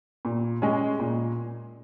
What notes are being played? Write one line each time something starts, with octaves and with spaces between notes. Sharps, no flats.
A#2
G#3 C#4 G#4
A#2